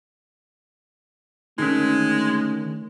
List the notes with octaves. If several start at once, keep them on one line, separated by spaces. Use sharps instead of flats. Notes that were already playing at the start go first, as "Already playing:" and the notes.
D3 D#3 G#3 A3 C#4 D#4 A#4